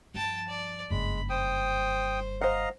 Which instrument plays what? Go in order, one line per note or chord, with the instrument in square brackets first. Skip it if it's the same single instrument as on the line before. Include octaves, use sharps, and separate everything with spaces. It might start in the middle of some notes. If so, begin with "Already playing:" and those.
[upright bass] G2 F3 [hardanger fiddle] G5 A5
[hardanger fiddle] D5
[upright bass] F#1 G2 [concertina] G#3 [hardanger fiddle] B5
[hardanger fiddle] C5 [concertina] G5 D#6
[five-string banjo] C5 F#5 [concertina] D#5 F5 A#5